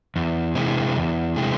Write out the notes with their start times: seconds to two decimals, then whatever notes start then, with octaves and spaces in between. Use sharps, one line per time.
0.16 E2
0.55 C3 E3 G#3
0.96 E2
1.36 C3 E3 G#3